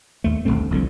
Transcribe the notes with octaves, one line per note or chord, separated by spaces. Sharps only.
D#2 A3
G1 A2 A3 C4
F1 C2 F2 D3